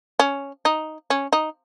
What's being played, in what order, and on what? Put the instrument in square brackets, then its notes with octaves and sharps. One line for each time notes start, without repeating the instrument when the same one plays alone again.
[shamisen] C#4
D#4
C#4
D#4